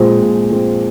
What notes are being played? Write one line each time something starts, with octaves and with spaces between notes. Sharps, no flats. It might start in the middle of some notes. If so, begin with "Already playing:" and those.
Already playing: A#2 F3 G#3 C4
A#2
F3 G#3 C4